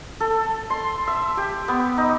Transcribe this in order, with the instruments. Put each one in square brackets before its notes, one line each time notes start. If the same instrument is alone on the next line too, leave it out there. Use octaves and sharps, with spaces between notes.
[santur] A4
C6
E5
G4
B3
D#4